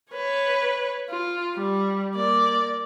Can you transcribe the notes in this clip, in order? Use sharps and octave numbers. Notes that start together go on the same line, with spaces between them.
B4 C#5
F4
G3
A#3 D5